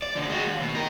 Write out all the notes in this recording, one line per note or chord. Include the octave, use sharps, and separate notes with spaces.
D5
E2 D3
G#3 F#4
D#2
B2
D#4 A#4